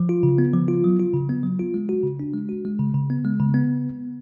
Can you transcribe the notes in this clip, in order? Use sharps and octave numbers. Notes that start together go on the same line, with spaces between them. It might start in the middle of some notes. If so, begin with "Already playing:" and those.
Already playing: F3
F4
C#3
B3
F3
F4
F#3
F4
C#3
B3
F#3
F4
G#3
F#4
C#3
D4
G#3
F#4
G#3
C#3
C#3
B3
G#3
C#3
B3